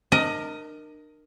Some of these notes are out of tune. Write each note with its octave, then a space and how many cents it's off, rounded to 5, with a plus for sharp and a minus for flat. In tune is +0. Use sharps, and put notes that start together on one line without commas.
D4 +40 A#4 +0 D#5 +15